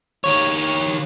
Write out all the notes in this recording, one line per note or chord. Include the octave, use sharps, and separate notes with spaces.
D#3 C#5